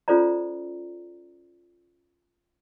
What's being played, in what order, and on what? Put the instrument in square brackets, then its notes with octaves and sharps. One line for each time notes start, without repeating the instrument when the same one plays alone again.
[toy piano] C#4 F4 A4 C5 D5 A#5